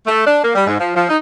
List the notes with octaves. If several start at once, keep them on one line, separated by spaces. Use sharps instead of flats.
A3
D4
A#3
G3
G#2
F3
F3
D#4